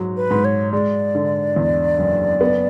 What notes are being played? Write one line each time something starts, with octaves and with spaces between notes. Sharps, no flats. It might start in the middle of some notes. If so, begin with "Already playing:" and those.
Already playing: G#2 F#3
B4
G#2
C#5
G#3 D5
D3
E2
F#1
B3